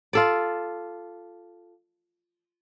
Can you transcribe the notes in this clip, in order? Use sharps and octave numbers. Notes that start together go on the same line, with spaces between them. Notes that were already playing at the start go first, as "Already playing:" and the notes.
F4 A4 D5